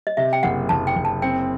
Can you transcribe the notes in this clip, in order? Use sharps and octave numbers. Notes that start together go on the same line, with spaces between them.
D#5
C3 E5
G5
F#1 F#5
F#1 A5
G5
F#1
A5
C4 G5